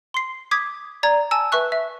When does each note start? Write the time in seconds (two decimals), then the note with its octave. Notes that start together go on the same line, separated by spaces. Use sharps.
0.14 C6 C7
0.51 D6 D#6 G#6 B6
1.03 D5 A#5 G#6
1.31 G#5 A5 E6
1.52 B4 E5 C#6 F#6
1.72 E5